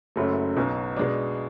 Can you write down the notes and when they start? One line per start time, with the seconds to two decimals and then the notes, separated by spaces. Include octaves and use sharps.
0.16 F#1 F#2 C#3 F#3 A3
0.56 B1 B2 F#3
0.97 B2 G#3 D4